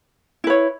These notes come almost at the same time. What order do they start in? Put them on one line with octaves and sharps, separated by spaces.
E4 B4 C#5